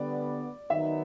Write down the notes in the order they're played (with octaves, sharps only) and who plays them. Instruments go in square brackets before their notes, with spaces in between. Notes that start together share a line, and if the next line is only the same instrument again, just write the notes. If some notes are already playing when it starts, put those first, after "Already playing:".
Already playing: [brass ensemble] D3 G3 B3 [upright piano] D5
[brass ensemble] D#3 F#3 B3 D#4 [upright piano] E5